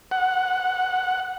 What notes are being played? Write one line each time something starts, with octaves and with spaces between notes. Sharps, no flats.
F#5